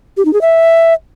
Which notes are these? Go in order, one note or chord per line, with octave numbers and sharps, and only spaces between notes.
G4
D#4
G#4
E5